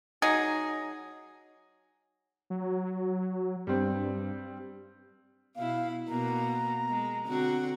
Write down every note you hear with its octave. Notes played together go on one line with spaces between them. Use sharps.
F#3 D#4 G#4
F#3
G2 G3 C4
B2 E4 F5
B2 A#3 B3 A#5
G#3
D3 C4 F#4